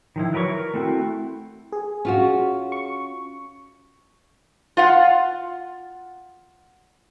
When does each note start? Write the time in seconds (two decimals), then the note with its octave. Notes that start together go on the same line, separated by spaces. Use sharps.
0.16 D#3 F3 E4
0.33 F#3 A#4 B4 D5 C#6
0.48 A#4
0.74 A3 C4 E4 F#4
1.72 G#4
2.05 C#4 F4 F#4
2.72 C#6
4.77 F4 F5 F#5